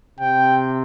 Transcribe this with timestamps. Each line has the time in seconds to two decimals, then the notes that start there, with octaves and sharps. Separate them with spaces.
0.19 C3 G5